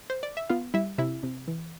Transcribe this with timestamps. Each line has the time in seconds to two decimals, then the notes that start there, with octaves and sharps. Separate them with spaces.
0.10 C5
0.23 D5
0.37 E5
0.49 B3 F4 F5
0.74 G3 E4 E5
0.98 C3 E4 E5
1.23 C3
1.48 E3